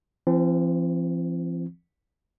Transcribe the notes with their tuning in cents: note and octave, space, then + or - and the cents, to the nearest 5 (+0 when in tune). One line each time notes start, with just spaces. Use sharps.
F3 -45 C4 +5